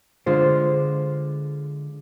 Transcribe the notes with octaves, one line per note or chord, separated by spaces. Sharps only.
D3 G#3 F4 C5